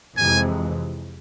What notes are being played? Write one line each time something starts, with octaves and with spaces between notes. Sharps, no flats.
F2 C3 E3 G#3 G#5